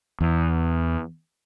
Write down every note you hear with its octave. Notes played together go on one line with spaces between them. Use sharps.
E2